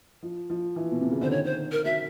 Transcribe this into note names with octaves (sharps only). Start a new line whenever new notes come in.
F3
F3
E3
B2
C3
C#3
D3 C5
D#3 C#5
C5
A#4
F#3 E5